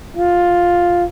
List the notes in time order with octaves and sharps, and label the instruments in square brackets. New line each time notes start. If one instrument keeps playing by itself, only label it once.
[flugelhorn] F4